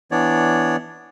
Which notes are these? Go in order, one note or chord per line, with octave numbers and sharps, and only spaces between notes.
E3 B3 D4 C#5 D5